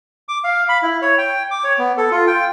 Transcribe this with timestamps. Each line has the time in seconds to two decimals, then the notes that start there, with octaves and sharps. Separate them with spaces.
0.29 D6
0.44 F5
0.69 B5
0.83 E4
1.02 C#5
1.18 G5
1.51 D6
1.64 C#5
1.78 B3
1.97 A4
2.11 F4
2.27 G5